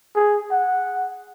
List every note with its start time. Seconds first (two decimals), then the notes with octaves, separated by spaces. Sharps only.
0.16 G#4
0.51 F#5